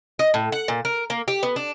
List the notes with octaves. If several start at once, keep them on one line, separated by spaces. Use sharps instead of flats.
D#5
A2
F#5
A#2
A#4
A#3
G4
B3
D4